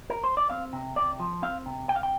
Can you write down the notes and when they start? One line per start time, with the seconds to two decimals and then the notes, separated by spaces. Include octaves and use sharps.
0.10 A#4
0.24 C5
0.37 D5
0.50 C4 F5
0.73 C3
0.96 C3 D5
1.20 F3
1.42 C4 F5
1.66 C3
1.89 C3 G5
1.96 F5
2.03 G5